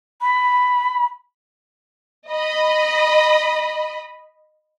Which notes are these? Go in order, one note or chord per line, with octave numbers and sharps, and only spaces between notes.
B5
D#5 B5